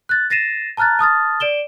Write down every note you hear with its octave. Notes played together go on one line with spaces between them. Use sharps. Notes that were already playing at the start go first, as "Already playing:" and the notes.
F#6 A6
A6 A#6 C7 D#7 E7
A5 A#5 F6 F#6 A6
A5 D#6 F6 A6
D5 D7 E7 G7